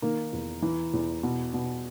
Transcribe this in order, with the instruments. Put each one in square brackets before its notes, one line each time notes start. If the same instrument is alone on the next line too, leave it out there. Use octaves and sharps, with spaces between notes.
[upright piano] D#3 A#3
E2
E3
E2
B2
B2